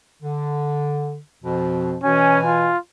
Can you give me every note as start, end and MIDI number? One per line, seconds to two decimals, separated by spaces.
0.23 1.18 50
1.43 1.96 41
1.43 1.96 47
1.43 1.96 53
2.03 2.70 47
2.03 2.70 52
2.03 2.39 61
2.03 2.70 80
2.45 2.78 65